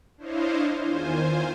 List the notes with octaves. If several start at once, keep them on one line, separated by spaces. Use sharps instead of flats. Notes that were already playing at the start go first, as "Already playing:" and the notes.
D4 E4 C5 C#5 D#5 F5
E2 D#3 F4 C5 G#5